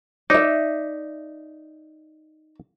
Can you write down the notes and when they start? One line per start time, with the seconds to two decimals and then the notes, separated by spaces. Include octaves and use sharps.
0.30 D#4 D5 E5